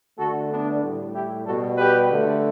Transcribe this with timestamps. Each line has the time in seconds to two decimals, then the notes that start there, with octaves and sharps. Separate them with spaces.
0.17 D3 A3 F#4 A4
0.50 B3 D4
0.82 A2 G3
1.14 E4 G4
1.46 B2 G3 F#4 A4
1.78 G4 B4
2.10 D3 A3